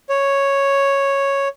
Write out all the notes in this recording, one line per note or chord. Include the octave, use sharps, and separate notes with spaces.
C#5